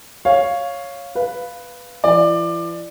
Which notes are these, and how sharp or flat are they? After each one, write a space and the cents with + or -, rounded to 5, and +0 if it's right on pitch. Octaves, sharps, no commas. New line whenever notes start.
C#5 +0 F5 +0
B4 +0 F5 +0
E3 +40 D5 +20